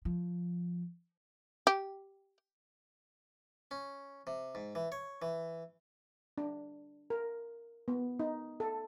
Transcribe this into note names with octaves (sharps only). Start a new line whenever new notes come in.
F3
G4
C#4
C3
G#2
E3
C#5
E3
D4
A#4
B3
D#4
A4